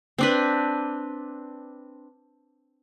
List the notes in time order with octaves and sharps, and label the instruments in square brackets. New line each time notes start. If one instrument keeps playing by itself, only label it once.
[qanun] C4 D4 B4